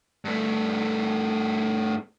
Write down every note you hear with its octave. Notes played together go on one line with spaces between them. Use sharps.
G2 A3